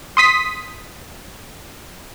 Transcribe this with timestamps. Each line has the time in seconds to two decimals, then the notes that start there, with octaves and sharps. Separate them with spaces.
0.17 C6 D#6 B6